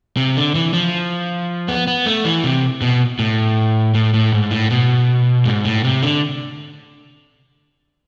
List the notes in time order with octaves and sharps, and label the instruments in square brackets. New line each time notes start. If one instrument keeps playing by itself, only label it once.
[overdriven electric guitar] C3
D3
E3
F3
B3
B3
A3
E3
C3
B2
A2
A2
A2
G#2
A2
B2
G#2
A2
C3
D3